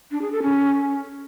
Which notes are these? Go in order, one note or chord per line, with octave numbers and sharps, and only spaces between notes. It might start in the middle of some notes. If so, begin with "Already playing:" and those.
D4
G#4
A4
C#4